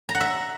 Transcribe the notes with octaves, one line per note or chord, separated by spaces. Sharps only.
A#5
F#5
E5